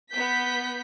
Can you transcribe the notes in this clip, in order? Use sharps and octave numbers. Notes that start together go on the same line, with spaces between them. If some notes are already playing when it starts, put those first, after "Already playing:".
B3 G6 B6